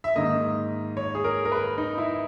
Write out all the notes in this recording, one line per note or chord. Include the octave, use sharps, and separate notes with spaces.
E5
G#2 D#3 A#3 D#5
C#5
G#4
A#4
A#4
B4
D#4
E4